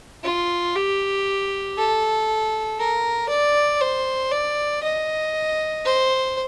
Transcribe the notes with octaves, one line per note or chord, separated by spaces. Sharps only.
F4
G4
A4
A#4
D5
C5
D5
D#5
C5